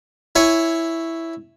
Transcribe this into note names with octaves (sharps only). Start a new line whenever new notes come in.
E4 C#5 G#5